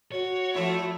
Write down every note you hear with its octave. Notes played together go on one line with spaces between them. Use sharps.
F#4 C#5
F3 A3 E4